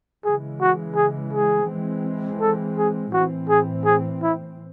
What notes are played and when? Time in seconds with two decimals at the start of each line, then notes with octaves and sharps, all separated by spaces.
0.24 C#3 E3 G#3 G#4
0.61 F#4
0.96 G#4
1.33 G#4
1.69 E3 G#3 C4
2.41 A4
2.78 G#4
3.13 A2 E3 C4 F#4
3.49 G#4
3.85 G#4
4.22 E4